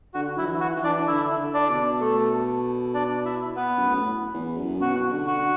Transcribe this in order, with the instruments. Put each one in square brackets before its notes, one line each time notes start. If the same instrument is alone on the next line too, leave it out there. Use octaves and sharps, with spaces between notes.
[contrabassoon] D3 [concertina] F#4
[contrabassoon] F#3 [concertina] E4
[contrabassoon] E3
[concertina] F#4
[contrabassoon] E3
[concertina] D4 D5
[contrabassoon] D3 [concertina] E4 E5
[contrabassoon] D3
[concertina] D4 D5
[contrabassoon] B2
[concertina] A3 A4
D4 D5
E4 E5
B3 B4
[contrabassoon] F#2
A2
E2
F#2
[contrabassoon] B2 [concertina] F#4
[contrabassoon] D3
[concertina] F#4